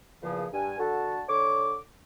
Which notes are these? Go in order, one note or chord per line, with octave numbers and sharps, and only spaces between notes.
E2 A#2 C#3 F3
G2 G#5
D3 F#4 A4 A5
D3 C#5 D6